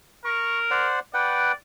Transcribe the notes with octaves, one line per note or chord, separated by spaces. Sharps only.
A#4 C#6
C5 D5 F#5
B4 D5 F#5 G5